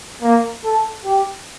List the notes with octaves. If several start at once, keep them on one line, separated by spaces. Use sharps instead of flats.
A#3
A4
G4